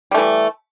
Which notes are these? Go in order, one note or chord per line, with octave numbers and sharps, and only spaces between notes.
E3 G3 A3